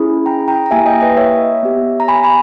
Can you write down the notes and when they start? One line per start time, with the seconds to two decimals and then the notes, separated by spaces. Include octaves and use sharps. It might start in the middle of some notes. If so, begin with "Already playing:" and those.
Already playing: C#4 E4 G#4
0.26 G5 A#5
0.48 G5 A#5
0.66 A#5
0.71 A#3 E4 G4 E5 G#5
0.86 D#5 G5
1.01 B4 D#5
1.17 C#5 E5
1.63 B3 G4
2.00 A#5
2.08 G#5 B5
2.24 G#5 B5